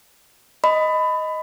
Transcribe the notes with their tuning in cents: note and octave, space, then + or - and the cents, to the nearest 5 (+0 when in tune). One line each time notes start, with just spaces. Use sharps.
D#5 +0 B5 +20